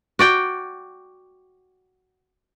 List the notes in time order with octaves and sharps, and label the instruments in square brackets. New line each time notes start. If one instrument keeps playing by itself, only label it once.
[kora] F#4 D5 G5